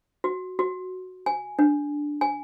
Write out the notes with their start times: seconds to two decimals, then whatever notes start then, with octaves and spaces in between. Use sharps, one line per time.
0.24 F#4
0.59 F#4
1.26 G#5
1.59 D4
2.21 G#5